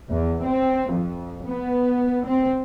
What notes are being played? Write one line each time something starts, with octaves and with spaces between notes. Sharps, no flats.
E2
C4
F2
B3
C4